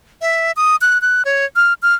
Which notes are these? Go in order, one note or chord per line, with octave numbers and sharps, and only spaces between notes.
E5
D#6
F#6
F#6
C#5
F6
F6